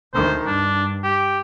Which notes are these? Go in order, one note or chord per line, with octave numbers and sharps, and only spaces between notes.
D2 D#3 C5
G2 D4
G4